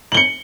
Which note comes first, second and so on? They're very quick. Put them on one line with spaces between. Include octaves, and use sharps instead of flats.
F#7 G7 C#7